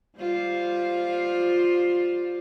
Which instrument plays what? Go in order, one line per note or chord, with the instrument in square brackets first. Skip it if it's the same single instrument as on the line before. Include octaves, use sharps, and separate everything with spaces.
[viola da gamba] G3 F4 C5